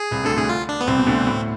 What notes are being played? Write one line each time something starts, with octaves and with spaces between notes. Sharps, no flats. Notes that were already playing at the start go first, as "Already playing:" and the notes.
Already playing: G#4
C2 C3
D2 D3 A4
D2 D3 G#4
F4
D4
B3
C2 C3 C4
B2
D2 D3
A2